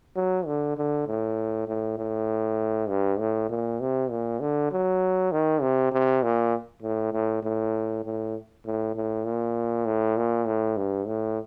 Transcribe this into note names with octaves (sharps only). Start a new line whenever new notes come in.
F#3
D3
D3
A2
A2
A2
G2
A2
A#2
C3
A#2
D3
F#3
D#3
C3
C3
A#2
A2
A2
A2
A2
A2
A2
A#2
A2
A#2
A2
G2
A2